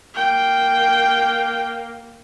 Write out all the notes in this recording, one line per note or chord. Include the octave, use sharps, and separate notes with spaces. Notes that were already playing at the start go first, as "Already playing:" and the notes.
A#3 G5